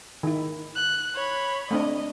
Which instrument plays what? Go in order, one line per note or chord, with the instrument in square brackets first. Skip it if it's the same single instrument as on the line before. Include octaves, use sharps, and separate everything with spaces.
[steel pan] D#3 E4
[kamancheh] F#6
C#5 B5
[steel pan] A3 C4 D4 [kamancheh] D#5